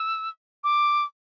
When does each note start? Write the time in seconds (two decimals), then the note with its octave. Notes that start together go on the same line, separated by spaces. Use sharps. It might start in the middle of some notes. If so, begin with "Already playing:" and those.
Already playing: E6
0.64 D6